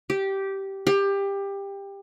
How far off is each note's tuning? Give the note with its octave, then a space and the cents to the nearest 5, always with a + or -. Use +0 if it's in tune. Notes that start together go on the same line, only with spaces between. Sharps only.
G4 -10
G4 +20